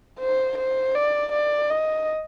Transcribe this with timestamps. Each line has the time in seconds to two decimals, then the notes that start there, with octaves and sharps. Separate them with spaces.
0.20 C5
0.58 C5
0.95 D5
1.32 D5
1.70 D#5